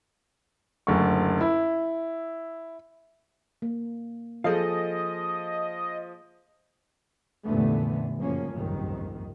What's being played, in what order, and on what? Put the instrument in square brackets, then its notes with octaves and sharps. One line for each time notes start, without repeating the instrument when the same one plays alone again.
[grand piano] F#1 D2 C#6
E4
[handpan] A#3
[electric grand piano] F3 [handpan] F4 G#4 [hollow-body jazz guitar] A4 F5 [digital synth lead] D#5
[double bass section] F1 A#2 D3 E3 A3 B3
F#1 F#2 F3 A#3 C#4
F#1 C2 F2 G#2 D#3